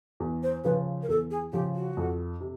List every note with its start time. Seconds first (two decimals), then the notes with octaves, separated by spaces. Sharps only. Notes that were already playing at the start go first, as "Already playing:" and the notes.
0.20 E2
0.43 C5
0.64 C#3 F3 B4
1.03 A#4
1.08 E2 A4
1.31 G#4
1.52 C#3 F3 G4
1.75 F#4
1.97 F2
2.41 C3